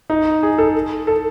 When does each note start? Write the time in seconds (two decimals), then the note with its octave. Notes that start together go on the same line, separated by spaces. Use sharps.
0.10 D#4
0.43 G#4
0.58 A4
1.07 A4